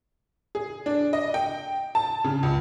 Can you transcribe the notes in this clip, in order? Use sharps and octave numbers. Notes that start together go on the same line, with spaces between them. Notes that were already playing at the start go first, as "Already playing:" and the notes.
G#4
D4
D#5
G5
A5
C#3
C#2